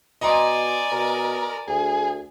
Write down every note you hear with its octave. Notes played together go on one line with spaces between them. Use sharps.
B2 D5 D#5 G#5 A#5 C6
B2 A#4
D2 G#4